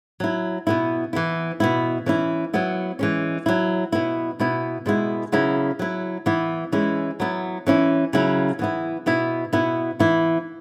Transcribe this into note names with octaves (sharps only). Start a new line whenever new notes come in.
F#3 E4
B2 B3 E4
E3 B3 E4
B2 B3 E4
E3 C#4 E4
F#3 B3 E4
E3 G#3 C#4
F#3 E4
B2 B3 E4
B2 B3 E4
B2 G#3 B3 E4
C#3 F#3 B3 E4
F#3 E4
E3 B3 E4
E3 G#3 C#4 E4
F#3 B3 E4
E3 C#4 E4
C#3 F#3 E4
E3 B3 E4
B2 B3 E4
B2 B3 E4
E3 B3 E4